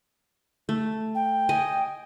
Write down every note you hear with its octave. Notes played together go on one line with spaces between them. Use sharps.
A3
G5
D#5 G#5